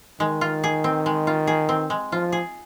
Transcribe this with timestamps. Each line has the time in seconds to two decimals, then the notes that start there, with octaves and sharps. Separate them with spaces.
0.20 D#3 G#3
0.41 F4
0.64 G#4
0.84 C4
1.06 G#3
1.27 F4
1.47 G#4
1.69 C4
1.90 G#3
2.12 F3 F4
2.32 G#4